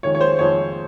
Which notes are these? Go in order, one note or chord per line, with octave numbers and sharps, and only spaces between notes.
F2 D#3 G#3 C#5
C#5
C5
F2 D#3 G#3 C#5